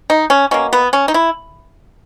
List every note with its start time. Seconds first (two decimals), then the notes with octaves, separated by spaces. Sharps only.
0.10 D#4
0.30 C#4
0.51 B2 A#3 C#4
0.73 B3
0.93 C#4
1.08 D#4
1.14 E4